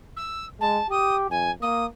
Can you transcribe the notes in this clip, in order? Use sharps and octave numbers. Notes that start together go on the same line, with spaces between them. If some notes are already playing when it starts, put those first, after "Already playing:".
E6
G#3 A5
G4 D#6
F2 G#5
A#3 D#6